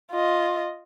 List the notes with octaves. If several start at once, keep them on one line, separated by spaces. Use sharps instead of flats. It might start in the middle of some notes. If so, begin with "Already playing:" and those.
F4 D#5